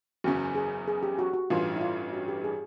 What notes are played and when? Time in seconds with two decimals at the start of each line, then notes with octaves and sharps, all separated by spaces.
0.24 F#1 E2 C#3 F#4
0.55 G#4
0.88 G#4
1.03 G4
1.19 F#4
1.34 F#4
1.50 A1 G2 E3 F4
1.76 E4
1.81 F4
2.13 F#4
2.28 G4
2.44 G#4